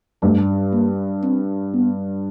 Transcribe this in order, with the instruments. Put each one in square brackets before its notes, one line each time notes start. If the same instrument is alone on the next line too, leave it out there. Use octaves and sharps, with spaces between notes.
[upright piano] G2 [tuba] A3
[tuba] A#3
C4
B3